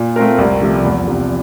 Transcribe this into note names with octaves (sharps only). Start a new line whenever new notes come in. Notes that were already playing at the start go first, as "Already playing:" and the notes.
Already playing: A#2
A3 C4 F4 A#4
C2
C3 F3 A3
E2
C3 F3